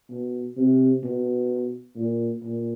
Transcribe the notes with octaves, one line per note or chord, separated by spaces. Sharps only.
B2
C3
B2
A#2
A#2